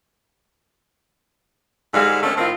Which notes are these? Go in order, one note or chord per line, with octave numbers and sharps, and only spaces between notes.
G#2 D3 G3 G#3 F5
D3 D#3 A3 C#4
A2 D#3 C4 F4